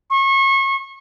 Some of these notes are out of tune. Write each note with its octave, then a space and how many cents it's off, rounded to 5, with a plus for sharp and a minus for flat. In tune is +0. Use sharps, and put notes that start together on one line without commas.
C#6 -30